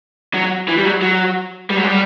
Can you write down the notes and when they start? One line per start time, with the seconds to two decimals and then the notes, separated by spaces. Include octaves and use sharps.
0.34 F#3
0.68 E3
0.78 G3
0.85 F#3
1.02 F#3
1.70 G3
1.77 F#3
1.84 G3